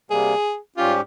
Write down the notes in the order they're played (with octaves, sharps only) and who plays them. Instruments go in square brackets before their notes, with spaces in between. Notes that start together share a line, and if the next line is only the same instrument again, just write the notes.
[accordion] C3 G3 A#3 [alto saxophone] G#4
[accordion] G#2 G3 C#4 G4 [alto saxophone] F4